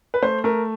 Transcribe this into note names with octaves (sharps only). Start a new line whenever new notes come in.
B4
A3 C5
A3 A#4